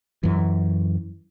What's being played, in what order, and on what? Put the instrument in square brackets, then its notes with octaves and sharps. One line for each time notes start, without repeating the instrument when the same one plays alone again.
[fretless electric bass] F#2 E3